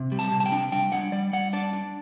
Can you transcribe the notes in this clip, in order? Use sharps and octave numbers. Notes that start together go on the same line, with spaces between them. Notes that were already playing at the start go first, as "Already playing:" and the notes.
Already playing: C3
G3
A5
C3
A5
G5
D4
G3 G5
G3 F#5
G3 D5
G3 F#5
D4 D5
D4